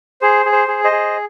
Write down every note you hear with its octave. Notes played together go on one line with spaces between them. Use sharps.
G#4 C5
G#4
C5
G#4
C5 D#5
G#4